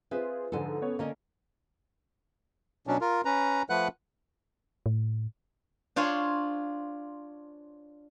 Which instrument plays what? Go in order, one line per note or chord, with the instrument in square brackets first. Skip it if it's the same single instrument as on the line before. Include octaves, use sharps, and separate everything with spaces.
[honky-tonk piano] C4 F4 G#4 [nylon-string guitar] B4 C5 E5
[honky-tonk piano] G#2 D3 F3 [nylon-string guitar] A4 G#5
[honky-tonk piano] B3 C#4 C#5
[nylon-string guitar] D3 C#4 D#5 [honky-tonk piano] A#3
[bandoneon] B2 F#3 C#4 D4
F4 A#4
C#4 B4 A#5
F3 A3 B4 F#5 F#6
[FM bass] A2
[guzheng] D4 F4 C5 C#5 G#5